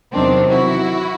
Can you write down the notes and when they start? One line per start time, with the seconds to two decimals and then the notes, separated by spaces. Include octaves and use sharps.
0.12 E2 C3 D#3 F#3 C4 D4
0.50 E4 F#4